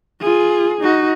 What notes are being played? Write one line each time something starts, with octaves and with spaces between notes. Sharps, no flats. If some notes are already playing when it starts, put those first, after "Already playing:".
F4 G#4
D#4 F#4